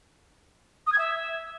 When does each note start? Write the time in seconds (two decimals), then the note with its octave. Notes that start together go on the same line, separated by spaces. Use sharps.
0.86 D#6
0.92 G#6
0.98 E5